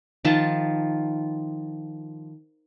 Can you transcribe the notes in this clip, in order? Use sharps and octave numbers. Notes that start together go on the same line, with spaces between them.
D#3 F3 F4 A5